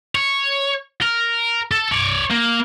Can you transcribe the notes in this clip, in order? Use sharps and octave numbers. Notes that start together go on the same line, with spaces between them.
C#5
A#4
A4
C#5 D5
A#3